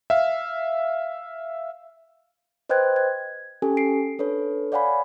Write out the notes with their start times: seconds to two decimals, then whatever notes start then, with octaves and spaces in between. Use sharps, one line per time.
0.10 E5 F5
2.69 B4 C5 D#5 G5 F#6 G#6
2.96 G#6
3.62 C#4 G4 A4 G#5
3.77 C7 D7
4.19 D4 A4 B4 C#5
4.72 C#5 D5 F5 F#5 G#5 B5